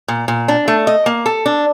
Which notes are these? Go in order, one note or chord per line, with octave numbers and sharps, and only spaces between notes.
A#2
A#2
D4
A3
D#5
A#3
A4
D4